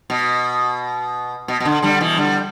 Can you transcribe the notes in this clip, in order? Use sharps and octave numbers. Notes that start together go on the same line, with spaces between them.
B2
B2
B2
D3
D3 G3
B2 E3
D3 G3